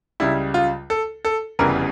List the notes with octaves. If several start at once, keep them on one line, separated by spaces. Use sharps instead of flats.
C#2 C#3 G3 E4
F4
A4
A4
F1 E2 C#3 E3 G3 A#4